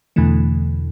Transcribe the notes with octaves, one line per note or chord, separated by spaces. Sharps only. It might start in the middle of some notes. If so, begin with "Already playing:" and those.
E2 B2 D3 E3 A3